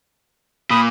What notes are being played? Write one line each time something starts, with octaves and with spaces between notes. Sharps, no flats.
A#2 B5 D#6